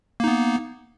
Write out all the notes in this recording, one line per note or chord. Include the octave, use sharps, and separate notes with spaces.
A#3 B3 D#4